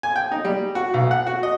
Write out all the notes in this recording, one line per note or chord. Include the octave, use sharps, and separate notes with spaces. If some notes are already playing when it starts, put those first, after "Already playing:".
G#5
G5
D#4
G3
F#4
B1
F#5
F#4
D#5